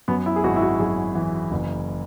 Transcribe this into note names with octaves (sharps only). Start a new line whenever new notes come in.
F#2 B3
E4
G#4
G#1 F#4
E4
F#4
F#2 G#4
E3
F#1